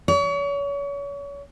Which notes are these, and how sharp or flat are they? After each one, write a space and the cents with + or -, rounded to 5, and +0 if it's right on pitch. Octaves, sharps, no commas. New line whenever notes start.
C#5 +35